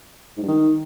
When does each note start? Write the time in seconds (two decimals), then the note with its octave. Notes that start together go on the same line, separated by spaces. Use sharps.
0.37 G#2
0.42 G2
0.48 D#3